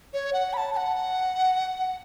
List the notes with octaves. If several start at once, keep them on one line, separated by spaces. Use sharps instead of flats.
C#5
F#5
B5
A5
A5
F#5